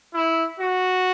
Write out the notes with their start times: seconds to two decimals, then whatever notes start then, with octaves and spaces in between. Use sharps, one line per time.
0.15 E4
0.60 F#4